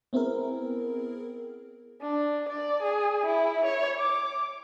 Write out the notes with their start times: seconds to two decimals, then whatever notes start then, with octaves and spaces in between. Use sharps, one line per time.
0.13 B3 C4 E4 G#4 A#4
2.02 D4
2.49 D5
2.83 G#4
3.26 E4
3.66 C#5
3.99 D6